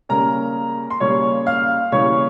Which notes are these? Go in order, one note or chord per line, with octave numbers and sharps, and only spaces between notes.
C#3 G3 A#3 C#4 A#4 A#5
C6
C#3 G3 A#3 C#4 C#5 C#6
F5 F6
C#3 E3 G3 A#3 C#5 C#6